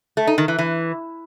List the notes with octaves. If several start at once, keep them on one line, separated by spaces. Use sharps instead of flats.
A3
D#4
D#3
E3
E3